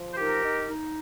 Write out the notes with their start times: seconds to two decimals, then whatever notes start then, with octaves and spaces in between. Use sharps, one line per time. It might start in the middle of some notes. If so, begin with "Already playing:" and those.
Already playing: F3
0.13 C5
0.17 D#4 G4 A#4
0.43 D#4
0.69 D#4